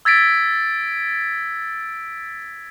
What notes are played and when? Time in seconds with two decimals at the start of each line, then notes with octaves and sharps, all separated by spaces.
0.05 E6 G#6 A6 B6 D7